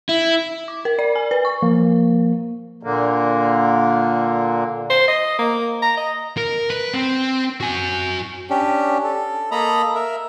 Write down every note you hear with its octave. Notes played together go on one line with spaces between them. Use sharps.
E4
D6
A#4
D5
G#5
B4
C#6
F3 A#3
A#2 D3 A#3
C5
D#5
A#3
A#5
D#5
A#4
B4
C4
F#4 G#5
C#4 D4 G4
A4
A#3 A4 D#5 A#5 B5
A#4 E5